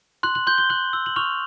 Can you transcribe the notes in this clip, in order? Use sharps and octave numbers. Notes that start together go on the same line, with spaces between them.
C6 F#6 F#7
F#6 F#7
C6 G6 G7
G6 G7
F#6 G6 F#7
E6
F#7
C#6 F6 F7